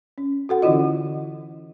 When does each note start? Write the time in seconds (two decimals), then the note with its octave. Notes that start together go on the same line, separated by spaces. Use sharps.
0.18 C#4
0.49 F#4 A4 F#5
0.62 D3 E3 C#4 E4 F4 D#5